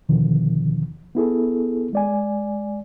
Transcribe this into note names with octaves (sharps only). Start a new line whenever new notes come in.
E2 B2 D3 D#3 F3
B3 E4 G#4 A4
G#3 D5 G#5